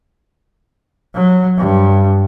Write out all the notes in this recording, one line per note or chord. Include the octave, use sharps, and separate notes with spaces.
F#3
G2